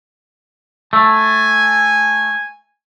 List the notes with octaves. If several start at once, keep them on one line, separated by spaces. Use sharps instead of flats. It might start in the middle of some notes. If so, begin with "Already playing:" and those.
A3 G#5